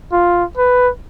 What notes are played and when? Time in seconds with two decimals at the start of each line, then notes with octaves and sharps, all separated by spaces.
0.12 F4
0.57 B4